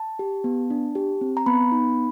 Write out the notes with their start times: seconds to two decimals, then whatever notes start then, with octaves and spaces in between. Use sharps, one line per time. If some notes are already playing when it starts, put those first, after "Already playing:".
Already playing: A5
0.19 G4
0.44 B3
0.70 D4
0.95 G4
1.21 C4
1.37 A#5
1.46 B3 B5
1.72 D#4